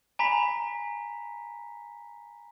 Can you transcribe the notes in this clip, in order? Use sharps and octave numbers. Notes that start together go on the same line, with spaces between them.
G#5 A#5 B5 B6